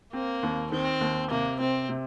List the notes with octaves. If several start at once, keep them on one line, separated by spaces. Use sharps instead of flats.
A#3 C4
D#2
D#3 C4
D#2
C3 A#3
C3 C4
C3